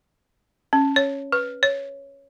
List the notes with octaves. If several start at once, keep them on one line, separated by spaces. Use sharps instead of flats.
C#4
C#5
B4
C#5